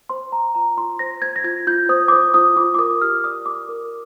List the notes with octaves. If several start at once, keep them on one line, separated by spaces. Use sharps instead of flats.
C5 C6
C5 A#5
F4 A#5
F4 C6
C5 A#6
C5 G#6
A#6
F4 G#6
F4 G6
C5 D#6
D6
C5 D#6
F4 D#6
F4 D6
D6
A#4 D#6
G4 F6
D5 D#6
G4 D6
A#4